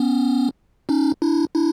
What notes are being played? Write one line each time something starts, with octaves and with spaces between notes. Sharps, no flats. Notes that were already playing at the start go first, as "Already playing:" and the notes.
Already playing: B3 C#4
C#4 D#4
D4 E4
D4 E4